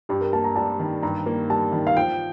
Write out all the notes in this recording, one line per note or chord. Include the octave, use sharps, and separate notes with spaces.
G2 G4
A#4
A#3 A5
A#5
G3 A5
D#3
G2 A#5
A#3
G3 A5
D#3
F5
F3 G5